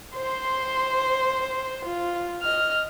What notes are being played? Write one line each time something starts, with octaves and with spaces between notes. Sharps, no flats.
C5 C6
F4
D#5 F6